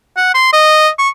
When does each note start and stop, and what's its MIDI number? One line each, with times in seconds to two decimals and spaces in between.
0.17 0.32 78
0.34 0.51 84
0.53 0.89 75
0.99 1.09 85